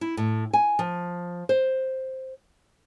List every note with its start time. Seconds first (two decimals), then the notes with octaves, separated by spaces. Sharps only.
0.01 E4
0.17 A2
0.53 G#5
0.79 F3
1.49 C5